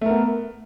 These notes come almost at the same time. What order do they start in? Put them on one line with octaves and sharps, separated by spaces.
A3 A#4 B3